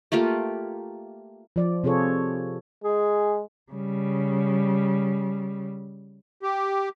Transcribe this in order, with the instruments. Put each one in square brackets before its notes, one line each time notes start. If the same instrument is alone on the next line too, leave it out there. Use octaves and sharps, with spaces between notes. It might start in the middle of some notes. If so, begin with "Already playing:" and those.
[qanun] A3 A#3 F4 G4
[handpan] F3 D5
C3 F4 G#4 A4 C#5
[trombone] G#3 [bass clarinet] G#4
[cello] C#3 G3
[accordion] G4